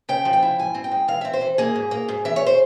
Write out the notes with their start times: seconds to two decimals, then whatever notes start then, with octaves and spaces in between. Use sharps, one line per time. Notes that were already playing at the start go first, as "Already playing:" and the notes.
0.09 C#3 G5
0.25 F3
0.33 G5
0.42 E4
0.59 G#2 G#5
0.75 C4
0.84 G5
0.92 G#3
1.08 E3 F5
1.21 C4 E5
1.33 C5
1.41 E3
1.58 A#3 G#4
1.75 G#2
1.91 A#3
2.08 G#2
2.25 E3 E5
2.36 C#5
2.46 C5